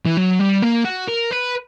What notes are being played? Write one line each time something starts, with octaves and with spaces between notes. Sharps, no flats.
E3
F#3
G3
A#3
F#4
A#4
B4